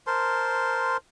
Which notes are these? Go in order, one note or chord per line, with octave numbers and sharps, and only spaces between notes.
A#4 C5 A5 C6